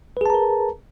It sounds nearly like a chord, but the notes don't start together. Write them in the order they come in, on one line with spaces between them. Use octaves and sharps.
B4 G#4 A5 A#5 A#4